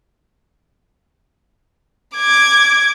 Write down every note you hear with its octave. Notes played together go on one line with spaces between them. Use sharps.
D6 G#6